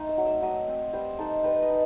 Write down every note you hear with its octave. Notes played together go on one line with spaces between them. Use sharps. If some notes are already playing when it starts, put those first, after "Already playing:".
Already playing: A3 C4 D#4
E5
F#3
E5
F#3 D#5
C4
G3 C5
D#4 A4
G3 B4
D#5
D#4